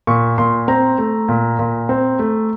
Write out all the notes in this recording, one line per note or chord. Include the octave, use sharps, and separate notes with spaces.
A#2 C#6
A#2 C6
C4 A#5
A3
A#2
A#2
C4
A3